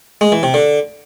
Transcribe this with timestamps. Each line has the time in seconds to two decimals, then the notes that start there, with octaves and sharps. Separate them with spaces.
0.21 G#3
0.32 E3
0.43 C3
0.54 D3